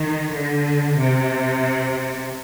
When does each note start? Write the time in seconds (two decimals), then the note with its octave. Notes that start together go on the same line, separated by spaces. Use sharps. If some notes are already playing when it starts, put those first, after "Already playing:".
Already playing: D#3
0.34 D3
0.99 C3